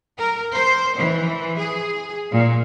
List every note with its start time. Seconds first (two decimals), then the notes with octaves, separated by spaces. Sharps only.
0.18 A#4
0.54 C5
0.96 E3
1.57 G#4
2.32 A#2